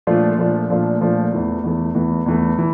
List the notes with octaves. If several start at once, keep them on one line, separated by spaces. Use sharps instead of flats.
A#2 F3 A3 D4 F4
A#2 F3 A3 D4 F4
A#2 F3 A3 D4 F4
A#2 F3 A3 D4 F4
E2 E3 A3
E2 E3 A3
E2 E3 A3
E2 E3 A3
E3